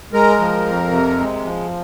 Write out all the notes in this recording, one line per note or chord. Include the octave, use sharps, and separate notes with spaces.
G#3 A#4
F3
F2
C3
G#3
F3